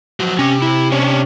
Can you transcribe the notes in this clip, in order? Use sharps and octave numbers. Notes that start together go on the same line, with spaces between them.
F3 F#3
C3 C#4
E4
C#4 D4 C#5